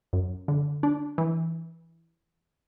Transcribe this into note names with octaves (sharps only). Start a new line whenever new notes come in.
F#2
D3
D4
E3